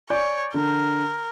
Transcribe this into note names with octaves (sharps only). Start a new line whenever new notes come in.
C#5 D5 G#5 G6
D3 A#4